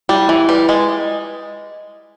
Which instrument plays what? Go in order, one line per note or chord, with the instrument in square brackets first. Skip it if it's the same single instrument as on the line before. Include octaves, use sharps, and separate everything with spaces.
[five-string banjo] G3 [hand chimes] E4
[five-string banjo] E3 [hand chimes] E4
[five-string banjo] G3 [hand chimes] B4
[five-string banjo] G#3 [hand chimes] D#5
[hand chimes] D#5